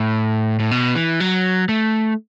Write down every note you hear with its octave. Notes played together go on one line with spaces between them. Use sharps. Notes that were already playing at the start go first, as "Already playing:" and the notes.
Already playing: A2
A2
B2
E3
F#3
A3